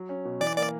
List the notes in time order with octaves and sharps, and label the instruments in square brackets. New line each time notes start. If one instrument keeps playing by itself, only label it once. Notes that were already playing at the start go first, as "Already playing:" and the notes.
Already playing: [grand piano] F#3
C#4
B2
[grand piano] E3 [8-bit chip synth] D5
[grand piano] A#3 [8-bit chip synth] D5